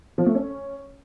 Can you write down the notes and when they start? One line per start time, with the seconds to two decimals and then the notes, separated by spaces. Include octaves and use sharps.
0.18 F3
0.26 A3
0.35 C#4